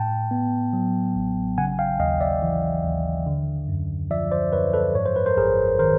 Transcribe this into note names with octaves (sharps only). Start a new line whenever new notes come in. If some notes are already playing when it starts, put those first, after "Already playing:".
Already playing: A2 G5 A5
B3
F#3
A1
C#3 F#5 G#5
F5 G5
D#2 D#5 F5
D5 E5
E3
D#2
D3
F#2
F3 D5 E5
C5 D5
F#2 B4 C#5
A4 B4
G#2 C#5
C5
B4
A#4 C5
G#1 G#4 A#4
D#3 A#4 C5